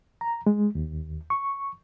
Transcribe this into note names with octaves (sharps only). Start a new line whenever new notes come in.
A#5
G#3
D#2
C#6